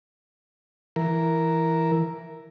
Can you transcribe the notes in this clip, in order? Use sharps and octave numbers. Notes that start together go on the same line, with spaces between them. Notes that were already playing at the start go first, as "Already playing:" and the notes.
E3 A#4